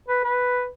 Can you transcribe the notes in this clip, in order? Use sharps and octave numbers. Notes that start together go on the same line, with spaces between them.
B4
B4